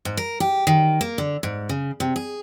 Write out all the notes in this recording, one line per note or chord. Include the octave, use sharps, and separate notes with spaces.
G#2
A#4
G4
D#3
A#3
D3
G#2
C#3
C3
G#4